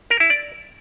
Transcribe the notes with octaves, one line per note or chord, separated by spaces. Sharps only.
A#4
E4
D5